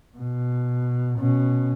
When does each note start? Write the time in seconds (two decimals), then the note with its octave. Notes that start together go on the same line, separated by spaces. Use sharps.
0.18 B2
1.18 B2 C#4